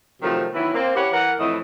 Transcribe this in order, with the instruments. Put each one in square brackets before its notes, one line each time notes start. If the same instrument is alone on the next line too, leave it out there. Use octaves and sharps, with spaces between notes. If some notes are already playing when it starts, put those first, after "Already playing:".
[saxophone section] C3 D#3 F3 F#3 A3 A#4
D#3 E3 F#3 B3 E4
A#3 C4
C#4 E4 G4 B4 C#5 F#5
E3 A#4 F#5
F2 A2 E3 D#5